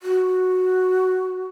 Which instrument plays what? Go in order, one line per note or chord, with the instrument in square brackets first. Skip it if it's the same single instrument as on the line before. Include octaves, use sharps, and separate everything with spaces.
[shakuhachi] F#4